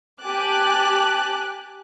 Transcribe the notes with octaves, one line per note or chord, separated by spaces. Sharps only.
G4 G#5 A5 D6 F#6